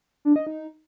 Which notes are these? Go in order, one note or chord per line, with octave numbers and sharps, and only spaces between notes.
D4
D#5
D#4